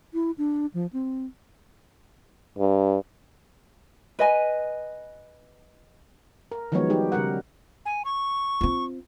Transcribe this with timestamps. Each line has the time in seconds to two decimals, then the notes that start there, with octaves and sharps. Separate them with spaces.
0.14 E4
0.38 D4
0.74 F3
0.93 C4
2.59 G2
4.19 B4 D#5 G#5
6.52 A#4
6.72 D#3 F3 F#3 G#3 B3 C#5
6.90 G3 D#4 G4
7.12 C#3 G3 A#4 F#5
7.86 G#5
8.05 C#6
8.61 C4 F4